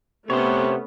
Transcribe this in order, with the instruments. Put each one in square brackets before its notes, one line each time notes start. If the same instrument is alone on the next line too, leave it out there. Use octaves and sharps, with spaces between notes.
[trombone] C3 [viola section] A3 B3 C#4 [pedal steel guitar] C5 C#5